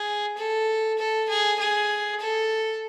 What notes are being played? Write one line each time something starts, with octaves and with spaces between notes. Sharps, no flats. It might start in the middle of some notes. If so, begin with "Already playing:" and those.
Already playing: G#4
A4
A4
G#4
G#4
A4